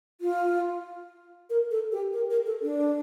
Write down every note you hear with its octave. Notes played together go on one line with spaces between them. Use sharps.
F4
A#4
A4
G4
A#4
A#4
A4
D4